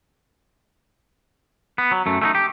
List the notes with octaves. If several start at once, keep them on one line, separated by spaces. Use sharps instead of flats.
B3
F#3
F#2 A3
A3 C#4 D#4
G4